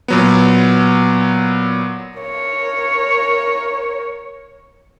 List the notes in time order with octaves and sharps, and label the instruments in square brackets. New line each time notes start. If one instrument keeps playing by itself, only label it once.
[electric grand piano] A#2 F#3 B3
[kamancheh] A#4 C#5